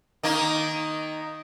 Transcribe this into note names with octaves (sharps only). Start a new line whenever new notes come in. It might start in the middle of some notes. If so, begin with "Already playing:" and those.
D#3 A#3 D#4